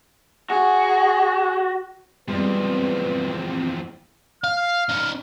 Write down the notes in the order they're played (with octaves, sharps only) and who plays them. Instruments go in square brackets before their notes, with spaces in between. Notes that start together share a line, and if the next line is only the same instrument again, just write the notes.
[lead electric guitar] F#4 [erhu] G#4
[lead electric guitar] E2 F3 [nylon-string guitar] G3 G#3 [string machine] C4 [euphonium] B4
[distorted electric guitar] F5 [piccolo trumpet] F6
[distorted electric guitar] C#4 D#4